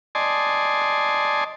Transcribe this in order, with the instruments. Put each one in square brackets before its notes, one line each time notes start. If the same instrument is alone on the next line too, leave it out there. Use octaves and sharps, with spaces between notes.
[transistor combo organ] D5 D#5 G#5 A5 C6